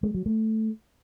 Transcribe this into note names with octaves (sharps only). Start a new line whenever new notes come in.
G#3
F#3
A3